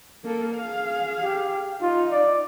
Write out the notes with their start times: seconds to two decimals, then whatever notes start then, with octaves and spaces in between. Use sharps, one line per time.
0.25 A#3 A4
0.56 G#4 F5
1.22 G4
1.81 D#4 F4
2.11 D5